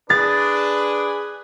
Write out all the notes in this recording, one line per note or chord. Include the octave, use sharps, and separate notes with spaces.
D4 G#4 B4 A6